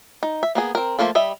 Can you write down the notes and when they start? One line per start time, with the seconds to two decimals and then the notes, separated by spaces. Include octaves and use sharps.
0.23 D#4
0.43 E5
0.55 A#3 B3 G#4
0.75 C4 A#4
0.99 F3 A3 A#3 F4 A4
1.15 G3 D#5 E5